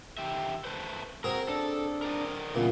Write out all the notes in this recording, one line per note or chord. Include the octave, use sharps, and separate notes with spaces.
D#3 G4 E5
A3 B4 C5
C4 F#4 G#4 A#4
D4 A4
A#4 D5 D#5
G2 A#2 C#3 E3 B3